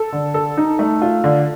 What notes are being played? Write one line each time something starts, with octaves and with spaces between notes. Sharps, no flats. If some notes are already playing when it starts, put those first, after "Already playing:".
Already playing: A4
D3
A4
D#4
A3
F4
D3